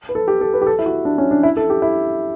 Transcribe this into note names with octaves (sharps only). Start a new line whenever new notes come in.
B4
A4
G4
A4
B4
G4
A4
E4
F#4
D4
C#4
D4
E4
A4
G4
E4